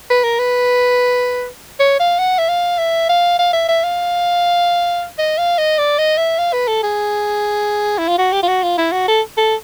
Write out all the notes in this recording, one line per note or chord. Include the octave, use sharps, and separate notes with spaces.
B4
A#4
B4
C#5
F5
F#5
E5
F5
E5
F5
F5
E5
E5
F5
D#5
F5
D#5
D5
D#5
E5
F5
B4
A4
G#4
E4
F4
F#4
G4
F4
F#4
F4
E4
F#4
A4
A4